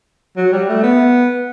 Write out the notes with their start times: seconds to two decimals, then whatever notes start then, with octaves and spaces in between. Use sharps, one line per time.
0.37 F#3
0.52 G3
0.69 A3
0.83 B3